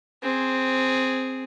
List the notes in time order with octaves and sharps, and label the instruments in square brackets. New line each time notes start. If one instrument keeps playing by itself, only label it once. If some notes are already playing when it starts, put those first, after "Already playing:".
[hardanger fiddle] C4 G#4